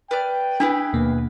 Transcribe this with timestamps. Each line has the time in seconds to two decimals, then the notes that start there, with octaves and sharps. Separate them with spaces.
0.11 B4 D5 G5 F6
0.60 D4 E4 G#4 B4
0.93 D#2 B2 A#3